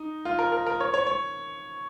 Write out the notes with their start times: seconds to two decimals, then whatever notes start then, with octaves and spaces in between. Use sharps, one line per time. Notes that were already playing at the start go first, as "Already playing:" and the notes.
Already playing: D#4
0.25 F4
0.39 A#4
0.52 A#4
0.67 A#4
0.80 C#5
0.94 C#5
1.07 C#5